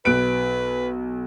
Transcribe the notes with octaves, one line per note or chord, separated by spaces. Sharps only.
B1 B4 F#6 D7